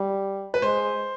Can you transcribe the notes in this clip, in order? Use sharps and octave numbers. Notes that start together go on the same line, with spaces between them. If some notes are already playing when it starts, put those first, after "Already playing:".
Already playing: G3
B4
G#3 C5